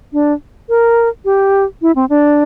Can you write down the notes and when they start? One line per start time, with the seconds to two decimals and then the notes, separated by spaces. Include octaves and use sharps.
0.13 D4
0.69 A#4
1.25 G4
1.82 E4
1.95 C4
2.10 D4